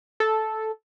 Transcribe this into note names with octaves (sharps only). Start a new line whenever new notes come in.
A4